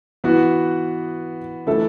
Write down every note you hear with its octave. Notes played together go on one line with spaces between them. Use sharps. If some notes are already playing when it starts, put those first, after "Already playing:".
E3 B3 F#4
E3 A3 E4 A4